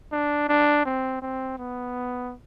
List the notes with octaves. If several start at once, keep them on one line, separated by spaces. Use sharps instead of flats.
D4
D4
C4
C4
B3